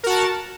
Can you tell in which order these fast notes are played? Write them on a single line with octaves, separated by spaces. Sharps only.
A#4 F#4 A5